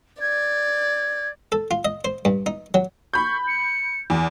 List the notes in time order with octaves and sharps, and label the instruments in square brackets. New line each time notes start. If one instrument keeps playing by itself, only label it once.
[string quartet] D5 [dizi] G#6
[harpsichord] A4
F4
D#5
C5
G2
D#4
F#3
[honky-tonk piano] B5 G6 [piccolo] C#6
[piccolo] C#7
[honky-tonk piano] E2